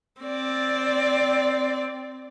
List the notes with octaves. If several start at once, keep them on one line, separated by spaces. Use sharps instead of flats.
C4 D5